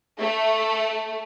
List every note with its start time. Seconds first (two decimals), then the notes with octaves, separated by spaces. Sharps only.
0.21 A3